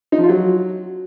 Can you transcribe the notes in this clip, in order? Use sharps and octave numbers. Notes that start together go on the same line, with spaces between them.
D#4
F3
F4
F#3